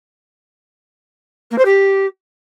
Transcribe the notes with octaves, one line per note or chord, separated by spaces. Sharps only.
A#3
C5
G4